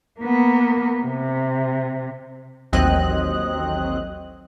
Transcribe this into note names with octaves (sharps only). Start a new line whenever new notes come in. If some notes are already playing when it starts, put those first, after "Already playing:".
A#3 B3
C3
A1 D#2 F#3 C4 D#5 F#6